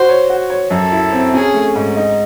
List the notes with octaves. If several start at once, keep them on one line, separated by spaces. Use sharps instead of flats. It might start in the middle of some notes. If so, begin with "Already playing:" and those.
Already playing: F#4 C5
C#5
F#4
C#5
F#2 A4
E4
C4
C#4 G#4
A3
G#2
D#4